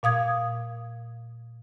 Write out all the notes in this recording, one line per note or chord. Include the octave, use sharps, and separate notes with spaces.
A#2 F5 D#6 G#6